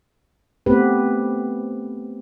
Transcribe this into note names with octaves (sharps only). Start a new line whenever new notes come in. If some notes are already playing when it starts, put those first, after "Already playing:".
A3 B3 C4 G4 B4